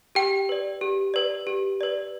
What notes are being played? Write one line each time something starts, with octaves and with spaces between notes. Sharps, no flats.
G4 G5
B4 D5
G4
B4 D5
G4
B4 D5